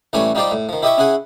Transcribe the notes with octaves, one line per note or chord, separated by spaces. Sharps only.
A1 E3 G3 A3 C#5 G#5
G3 D#4 F4 G4 C5 D5
A2
D#3 F3
E4 G4 D#5 E5 G5 C#6
C#4 E4 G#4 F#5 G#5